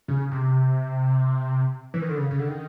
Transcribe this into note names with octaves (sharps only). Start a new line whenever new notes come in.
C#3
C3
E3
D#3
D3
C#3
C#3
D3
D#3